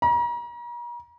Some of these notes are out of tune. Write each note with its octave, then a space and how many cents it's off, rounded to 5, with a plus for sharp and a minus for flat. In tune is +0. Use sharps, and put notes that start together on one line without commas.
A#5 +40